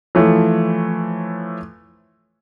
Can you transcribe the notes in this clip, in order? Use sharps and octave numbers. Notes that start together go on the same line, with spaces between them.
E3 F3 A3 C#5